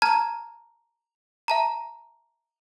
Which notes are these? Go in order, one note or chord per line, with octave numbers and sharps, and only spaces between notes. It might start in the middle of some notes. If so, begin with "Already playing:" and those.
A5 A#5 F6 G#6
E5 A5 A#5